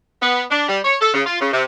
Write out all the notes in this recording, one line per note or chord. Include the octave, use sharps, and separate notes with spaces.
B3
D4
G3
C#5
A4
C#3
F4
C#3
C3